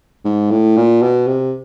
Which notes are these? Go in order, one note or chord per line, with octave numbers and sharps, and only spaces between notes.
G#2
A2
A#2
B2
C3